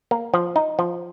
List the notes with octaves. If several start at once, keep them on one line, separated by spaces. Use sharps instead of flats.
A#3
F3
D#4
F3